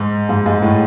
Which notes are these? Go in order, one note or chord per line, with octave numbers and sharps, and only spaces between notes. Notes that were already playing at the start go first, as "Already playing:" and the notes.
Already playing: G#2
G#2
G#2
A2